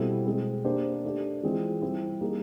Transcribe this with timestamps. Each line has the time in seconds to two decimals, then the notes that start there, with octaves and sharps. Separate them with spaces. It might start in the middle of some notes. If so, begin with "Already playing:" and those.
Already playing: B2 G3 C4 E4 A4
0.26 B2 G#3 C4
0.65 A#3 D4 G4 C5
1.04 A3 D4 G4
1.43 E3 G#3 C4 F4
1.82 G3 C4 E4 G4
2.21 G3 A#3 D#4 G#4